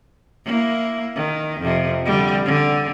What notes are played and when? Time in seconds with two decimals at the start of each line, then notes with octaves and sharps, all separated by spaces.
0.45 A#3 E4
1.15 D#3
1.60 F2 C3
2.05 D3 G3
2.46 D3